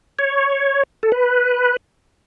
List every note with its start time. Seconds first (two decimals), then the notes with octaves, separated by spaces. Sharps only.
0.19 C#5
1.03 A4
1.12 B4